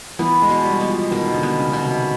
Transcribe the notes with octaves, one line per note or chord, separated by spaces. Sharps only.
E3 B3
G#3
B2
G3
B3
F3
B2 D#3
D3
B3
C#3
B2
C3